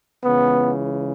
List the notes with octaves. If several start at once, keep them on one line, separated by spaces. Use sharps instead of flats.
C#2 C#3 E3 B3